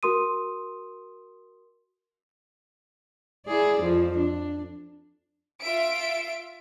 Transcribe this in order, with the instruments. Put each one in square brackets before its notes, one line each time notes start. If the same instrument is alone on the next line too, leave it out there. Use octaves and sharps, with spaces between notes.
[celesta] F#4 A#4 C6 D#6 D#7
[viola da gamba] E4 G#4 D5
F2 F3
D4
[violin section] F4 E5 D7